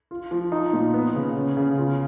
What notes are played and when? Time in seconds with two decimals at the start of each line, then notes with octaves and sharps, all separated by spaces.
0.11 F4
0.31 F3
0.52 D#4
0.73 A#2
0.94 B3
1.15 C#3
1.36 C#4
1.57 C#3
1.78 F4